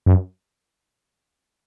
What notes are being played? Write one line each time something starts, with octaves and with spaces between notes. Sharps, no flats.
F#2